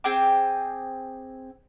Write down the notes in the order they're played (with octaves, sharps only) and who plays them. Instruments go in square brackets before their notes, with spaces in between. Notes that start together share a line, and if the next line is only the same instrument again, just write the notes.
[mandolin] C4 G#4 G5 D6